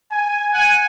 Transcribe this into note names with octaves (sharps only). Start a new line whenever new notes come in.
G#5
F#5 G#5